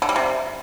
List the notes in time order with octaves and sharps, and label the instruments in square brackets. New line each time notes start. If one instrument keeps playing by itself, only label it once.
[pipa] D3
G3
C3